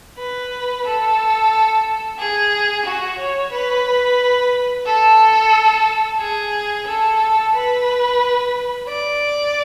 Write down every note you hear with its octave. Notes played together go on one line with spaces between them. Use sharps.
B4
A4
G#4
F#4
C#5
B4
A4
G#4
A4
B4
D5